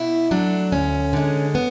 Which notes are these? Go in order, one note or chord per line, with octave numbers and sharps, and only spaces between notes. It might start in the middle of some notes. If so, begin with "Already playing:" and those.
Already playing: B2 E4
F#3 A3 D4
D2 C#4
D3 G#3
B3